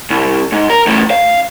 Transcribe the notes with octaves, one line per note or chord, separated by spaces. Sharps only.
C2
G#2
A#4
E2 A2
F5